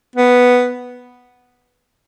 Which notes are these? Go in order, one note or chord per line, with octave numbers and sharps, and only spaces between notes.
B3